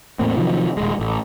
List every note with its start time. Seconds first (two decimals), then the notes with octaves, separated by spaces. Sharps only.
0.19 E2 A2 A#3 C4
0.37 C3 D#3 F3 F#3
0.77 D#1 G#3
1.00 A1